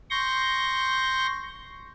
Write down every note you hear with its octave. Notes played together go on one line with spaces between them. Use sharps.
C6 C#6 G6 A#6